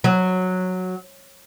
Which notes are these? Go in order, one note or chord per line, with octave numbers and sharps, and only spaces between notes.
F#3